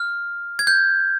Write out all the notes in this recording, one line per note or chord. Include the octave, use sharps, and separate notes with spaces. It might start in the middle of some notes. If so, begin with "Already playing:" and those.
Already playing: F6
G#6
G6